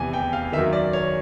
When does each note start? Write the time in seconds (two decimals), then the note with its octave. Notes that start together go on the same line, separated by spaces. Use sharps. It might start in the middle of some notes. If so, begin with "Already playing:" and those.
Already playing: E2 C3 E3 G#5
0.13 G5
0.33 F5
0.52 D#3 E5
0.58 F#2
0.73 D5
0.93 C#5